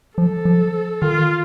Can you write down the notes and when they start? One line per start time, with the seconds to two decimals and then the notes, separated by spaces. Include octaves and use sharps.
0.18 F3 A4
0.45 F3
1.02 D#3 F4